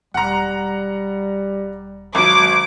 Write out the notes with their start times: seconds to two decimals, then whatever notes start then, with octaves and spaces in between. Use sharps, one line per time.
0.14 E1 G3 F#5 A#5
2.15 G#1 F#3 D6